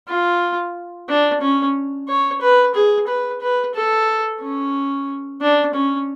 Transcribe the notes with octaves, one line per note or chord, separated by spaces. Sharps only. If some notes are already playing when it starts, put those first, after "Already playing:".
F4
D4
C#4
C#5
B4
G#4
B4
B4
A4
C#4
D4
C#4